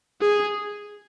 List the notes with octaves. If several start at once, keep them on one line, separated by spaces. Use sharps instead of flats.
G#4